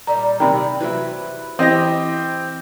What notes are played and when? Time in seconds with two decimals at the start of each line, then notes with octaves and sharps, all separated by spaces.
0.07 A#2 G3 D#4 A#5
0.40 C3 D#3 G5 A#5 B5
0.80 C3 E3 F#3 E4 B4
1.59 E3 C4 E4 G4 D#5 A#6